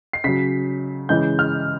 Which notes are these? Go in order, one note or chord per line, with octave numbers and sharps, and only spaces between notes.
C7
C#3 F#3 B6
C#3 E3 G#3 G6
F6